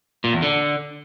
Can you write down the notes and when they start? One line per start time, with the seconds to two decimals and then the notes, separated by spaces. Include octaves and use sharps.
0.24 A#2
0.33 E2
0.42 D3